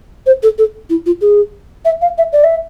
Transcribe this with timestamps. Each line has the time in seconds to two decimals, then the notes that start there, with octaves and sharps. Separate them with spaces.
0.26 C5
0.43 A4
0.58 A4
0.90 E4
1.06 F4
1.21 G#4
1.85 E5
2.02 F5
2.18 E5
2.33 D5
2.44 E5